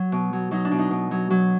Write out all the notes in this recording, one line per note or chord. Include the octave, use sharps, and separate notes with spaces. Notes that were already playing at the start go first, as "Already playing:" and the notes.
Already playing: F#3
B2
F#3
F#3 D#4
D4
B2
D#4
B2
F#3
F#3